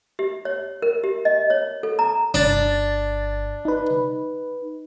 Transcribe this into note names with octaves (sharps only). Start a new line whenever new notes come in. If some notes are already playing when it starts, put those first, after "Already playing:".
G4
C#5
A#4
G4
D#5
C#5
A4
A#5
G1 D4 A6
D#4 B4